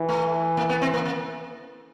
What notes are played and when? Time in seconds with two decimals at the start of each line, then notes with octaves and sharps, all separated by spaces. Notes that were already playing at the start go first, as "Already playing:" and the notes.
Already playing: E3
0.09 A3
0.57 A#3
0.69 B3
0.82 C4
0.94 A#3
1.05 A#3